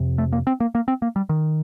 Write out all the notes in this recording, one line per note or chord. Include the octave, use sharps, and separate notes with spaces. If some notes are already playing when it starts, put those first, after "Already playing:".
Already playing: F2 C3
A3
A#3
C4
A#3
A#3
C4
A#3
G3
D#3